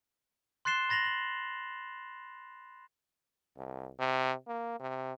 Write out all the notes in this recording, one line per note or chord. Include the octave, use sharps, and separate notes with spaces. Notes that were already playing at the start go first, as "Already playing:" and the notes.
C6 F#6 A6 C7 E7 G7
B5 A6 A#6 F7 F#7
A#6 F#7
C2
C3
A#3
C3